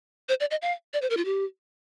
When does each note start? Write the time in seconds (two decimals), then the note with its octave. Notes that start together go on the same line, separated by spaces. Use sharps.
0.29 C5
0.40 D5
0.51 D#5
0.62 F5
0.93 D5
1.02 C5
1.10 A#4
1.17 F4
1.25 G4